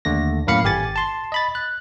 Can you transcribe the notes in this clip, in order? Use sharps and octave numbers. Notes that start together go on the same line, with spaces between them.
D#2 D3 A3 A#6
F#2 A2 A#3 F5 B5 C#7
G#1 G4 G#5 A6
A5 C6
D#5 B5 A6
F#6